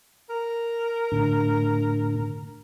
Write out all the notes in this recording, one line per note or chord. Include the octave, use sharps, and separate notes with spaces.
A#4
A2 D3